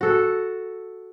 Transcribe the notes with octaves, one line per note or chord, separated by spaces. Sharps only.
F#4 A4